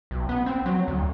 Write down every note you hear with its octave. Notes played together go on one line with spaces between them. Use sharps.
B1
B3
C4
F#3
D2